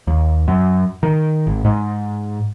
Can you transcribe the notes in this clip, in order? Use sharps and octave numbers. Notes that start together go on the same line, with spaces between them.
D#2
F#2
D#3
G#1
G#2